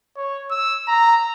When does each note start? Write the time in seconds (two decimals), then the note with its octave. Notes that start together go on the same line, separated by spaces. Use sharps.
0.16 C#5
0.51 E6
0.88 A#5